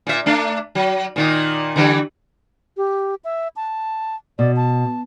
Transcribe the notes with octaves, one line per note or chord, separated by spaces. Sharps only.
A#2 E5
A3 D4
F#3
A#2 D#3 D#4
D3 E3 G3
G4
E5
A5
B2 D5
A5